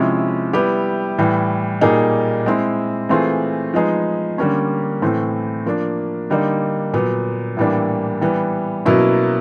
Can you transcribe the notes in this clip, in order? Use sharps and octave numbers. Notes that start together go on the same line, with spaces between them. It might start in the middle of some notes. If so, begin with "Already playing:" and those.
Already playing: C3 F3 G#3 C#4 E4
G3 B3 E4 G4
A2 E3 G3
A#2 G3 A#3 D#4 G#4
G#3 C4 E4
E3 A3 C4 F4 G#4
F3 G#3 B3 D#4 G#4
D3 G3 A#3 C#4
A2 E3 A3 C4
F3 A#3 D4
D3 G3 A#3 D#4
A#2 F#3 B3
A2 E3 G3 A#3 D4
E3 G3 B3
B2 F#3 A#3 C#4 E4